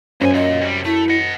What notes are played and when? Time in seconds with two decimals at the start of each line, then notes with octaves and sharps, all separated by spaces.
0.21 C#2 F#2 C5 G#5
0.34 A#2 D#5
0.62 C3 G3
0.85 A3 E4
1.09 D#5 F#5